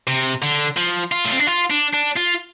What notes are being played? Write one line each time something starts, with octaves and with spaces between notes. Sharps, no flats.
C3
D3
F3
F4
A3
C4
D4
F4
D4
D4
F4